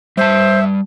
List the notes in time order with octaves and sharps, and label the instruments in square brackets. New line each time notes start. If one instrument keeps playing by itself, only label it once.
[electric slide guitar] G3 A5 [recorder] C5 [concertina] E5